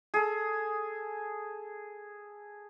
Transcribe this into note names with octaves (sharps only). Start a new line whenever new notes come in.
G#4 A4